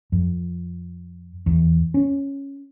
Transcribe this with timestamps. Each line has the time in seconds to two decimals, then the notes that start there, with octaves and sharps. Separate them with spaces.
0.12 F2
1.46 E2
1.94 C#4